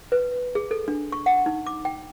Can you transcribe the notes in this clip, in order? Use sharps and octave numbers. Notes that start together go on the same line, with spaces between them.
B4
G#4
A4
D4
C#6
F#5
D#4
D6
G5